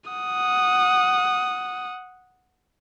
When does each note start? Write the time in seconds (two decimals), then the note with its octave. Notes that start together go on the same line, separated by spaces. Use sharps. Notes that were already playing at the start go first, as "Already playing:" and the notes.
0.10 F#5 D#6